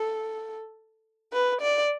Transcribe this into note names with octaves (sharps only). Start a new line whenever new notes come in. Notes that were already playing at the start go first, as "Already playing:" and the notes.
Already playing: A4
B4
D5